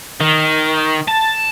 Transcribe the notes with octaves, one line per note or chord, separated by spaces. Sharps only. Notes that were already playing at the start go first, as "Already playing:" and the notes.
D#3
A5